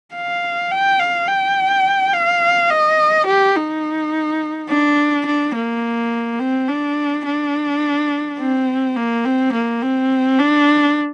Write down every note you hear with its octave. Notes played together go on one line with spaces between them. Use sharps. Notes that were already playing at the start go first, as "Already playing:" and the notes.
F5
G5
F5
G5
F5
D#5
G4
D#4
D4
D4
A#3
C4
D4
D4
C4
A#3
C4
A#3
C4
D4